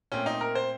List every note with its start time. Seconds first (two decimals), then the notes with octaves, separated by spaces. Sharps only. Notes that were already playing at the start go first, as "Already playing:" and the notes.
0.12 A#2 A3 C4 C#4
0.26 D#4
0.41 A#4
0.55 C5